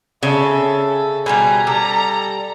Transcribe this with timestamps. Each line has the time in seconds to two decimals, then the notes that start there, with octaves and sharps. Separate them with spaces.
0.23 C#3 C#4 A4 E5
1.26 B2 F#3 G3 G#5 A#5
1.67 G3 A4 A#5